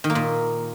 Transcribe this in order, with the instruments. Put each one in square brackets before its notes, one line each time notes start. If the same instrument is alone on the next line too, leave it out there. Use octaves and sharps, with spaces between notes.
[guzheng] D#3
A#3
A#2